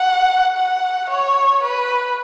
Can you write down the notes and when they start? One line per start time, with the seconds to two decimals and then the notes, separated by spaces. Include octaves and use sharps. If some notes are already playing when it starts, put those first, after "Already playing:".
Already playing: F#5
0.58 F#5
1.10 C#5
1.64 B4